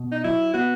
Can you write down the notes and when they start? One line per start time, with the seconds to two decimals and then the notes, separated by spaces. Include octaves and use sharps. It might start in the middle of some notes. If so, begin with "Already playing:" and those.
Already playing: B2
0.12 D#4
0.24 F#3 E4
0.54 B3 F#4